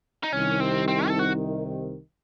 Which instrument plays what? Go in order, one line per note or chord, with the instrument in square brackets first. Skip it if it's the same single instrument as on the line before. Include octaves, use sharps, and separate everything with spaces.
[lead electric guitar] D#4
[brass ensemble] C2 C3 D#3 [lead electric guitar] C#4
[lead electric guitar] C4
C4
A4
F#4